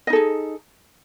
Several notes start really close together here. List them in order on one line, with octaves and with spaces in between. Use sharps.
D#5 D#4 A4 G#4